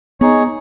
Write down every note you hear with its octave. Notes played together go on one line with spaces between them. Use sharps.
B3 D#4 G#4 C#5